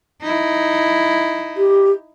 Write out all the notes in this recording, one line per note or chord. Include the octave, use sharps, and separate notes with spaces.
D#4 E4
G4